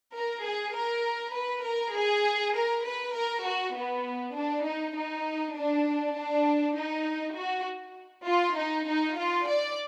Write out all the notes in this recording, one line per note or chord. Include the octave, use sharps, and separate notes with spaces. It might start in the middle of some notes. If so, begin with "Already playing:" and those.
A#4
G#4
A#4
B4
A#4
G#4
A#4
B4
A#4
F#4
B3
D4
D#4
D#4
D4
D4
D#4
F#4
F4
D#4
D#4
F4
D5